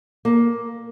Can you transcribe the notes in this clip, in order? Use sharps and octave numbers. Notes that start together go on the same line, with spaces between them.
A#3